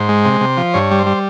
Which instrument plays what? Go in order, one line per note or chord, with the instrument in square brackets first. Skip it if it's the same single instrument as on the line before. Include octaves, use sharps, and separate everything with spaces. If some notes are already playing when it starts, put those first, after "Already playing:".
Already playing: [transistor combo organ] G#2 C5
G#3
C3
C3
F3
G2 C#5
G3
C5
G3